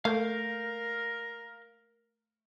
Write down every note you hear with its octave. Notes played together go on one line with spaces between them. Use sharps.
A3 A#3 A#4 F5 G6